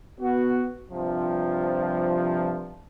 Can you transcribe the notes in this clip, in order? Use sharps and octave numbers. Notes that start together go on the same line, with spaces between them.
B3 F#4
G2 C3 F3